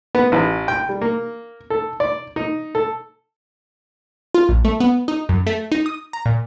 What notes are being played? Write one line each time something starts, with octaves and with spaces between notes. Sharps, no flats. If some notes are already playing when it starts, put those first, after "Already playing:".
B3
A1
G5
G3
A#3
A4
D5
D#4
A4
F4
A#1
A3
B3
D#4
F#2
A3
D#4
D#6
A#5
A#2